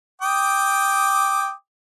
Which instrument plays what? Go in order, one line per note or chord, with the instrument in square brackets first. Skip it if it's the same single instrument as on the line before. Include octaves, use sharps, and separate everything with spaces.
[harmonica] G5 D6 D#6